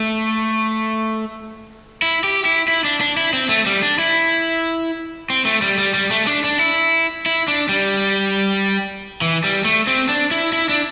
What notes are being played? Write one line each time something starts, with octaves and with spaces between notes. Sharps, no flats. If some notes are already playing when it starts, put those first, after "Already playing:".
Already playing: A3
E4
G4
E4
E4
D4
D4
E4
C4
A3
G3
D4
E4
C4
A3
G3
G3
G3
A3
D4
D4
E4
E4
D4
G3
E3
G3
A3
C4
D4
E4
E4
D4